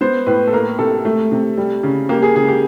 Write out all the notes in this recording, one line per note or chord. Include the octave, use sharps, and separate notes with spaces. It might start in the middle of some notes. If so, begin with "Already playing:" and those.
B3 C5
A2 B4
A4
A#3 A#4
C3 A4
A3
C3
G3
C#3
A#3 G4
G#4
C#3 G#4
G4